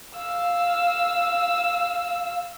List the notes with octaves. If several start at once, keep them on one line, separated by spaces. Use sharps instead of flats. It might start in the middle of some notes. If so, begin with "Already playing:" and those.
F5 E6